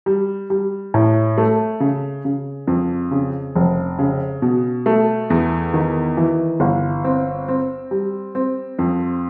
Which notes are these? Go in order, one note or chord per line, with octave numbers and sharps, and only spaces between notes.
G3
G3
A2
A3
C#3
C#3
F2
C#3
F1
C#3
B2
A3
E2
D#3
E3
G1
C4
C4
G3
C4
F2